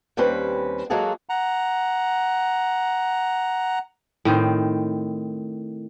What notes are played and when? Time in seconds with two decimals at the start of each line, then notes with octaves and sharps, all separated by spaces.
0.17 D#2 G3 C4 C#4 B4
0.90 F#3 G#3 A#3 F#4 G#4 A4
1.29 F#5 A#5
4.25 A2 D#3 C4